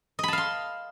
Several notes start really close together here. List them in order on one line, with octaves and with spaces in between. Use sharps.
D#5 B5 A5 F5 C6